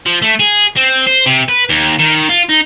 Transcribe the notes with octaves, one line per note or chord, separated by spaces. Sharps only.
F3
A3
G#4
C4
C5
C3
B4
D#2
D#3
F4
D#4